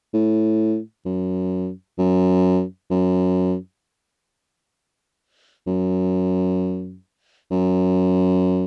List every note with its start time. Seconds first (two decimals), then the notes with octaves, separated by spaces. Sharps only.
0.14 A2
1.06 F#2
1.98 F#2
2.90 F#2
5.67 F#2
7.51 F#2